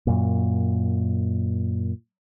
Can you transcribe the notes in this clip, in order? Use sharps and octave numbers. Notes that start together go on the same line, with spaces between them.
F#2 A#2